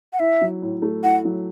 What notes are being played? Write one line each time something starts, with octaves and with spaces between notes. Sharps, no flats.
F#5
E4 E5
F#3
A2
A3
E4 F#5
F#3